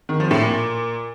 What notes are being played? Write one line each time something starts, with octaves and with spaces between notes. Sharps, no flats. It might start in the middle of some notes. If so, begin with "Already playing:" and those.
D#3
F3
A2
A#2